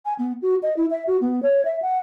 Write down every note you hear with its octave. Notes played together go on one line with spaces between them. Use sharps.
G#5
B3
F#4
D#5
E4
E5
F#4
B3
C#5
E5
F#5